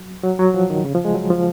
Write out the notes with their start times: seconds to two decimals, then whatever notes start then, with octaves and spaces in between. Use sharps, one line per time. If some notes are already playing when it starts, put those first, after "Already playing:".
Already playing: F#3
0.23 F#3
0.39 F#3
0.54 F3
0.70 D#3
0.85 C#3
0.95 F3
1.05 G#3
1.15 F#3
1.31 F3